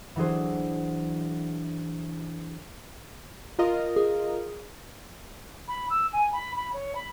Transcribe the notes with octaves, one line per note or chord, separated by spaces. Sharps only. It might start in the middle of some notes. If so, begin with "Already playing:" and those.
E3 F#3 D4 G#4 C5
F4 A#4 D#5
G#4
B5
E6
G#5
B5
B5
C#5
B5